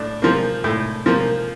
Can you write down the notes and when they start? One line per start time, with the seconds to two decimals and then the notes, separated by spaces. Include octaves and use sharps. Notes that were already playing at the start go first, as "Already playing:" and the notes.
Already playing: A2 D4
0.22 F3 A#3
0.64 A2
1.06 F3 A#3